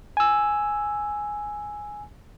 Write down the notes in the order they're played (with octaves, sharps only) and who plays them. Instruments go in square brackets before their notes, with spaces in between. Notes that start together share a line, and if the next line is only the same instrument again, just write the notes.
[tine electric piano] G#5 E6